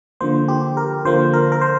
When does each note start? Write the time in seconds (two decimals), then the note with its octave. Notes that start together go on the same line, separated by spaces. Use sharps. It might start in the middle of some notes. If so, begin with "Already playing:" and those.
0.21 D3 F3 A#3 C5
0.48 G4
0.77 A#4
1.05 D3 F3 A#3 C5
1.33 A#4
1.52 A#4
1.61 C5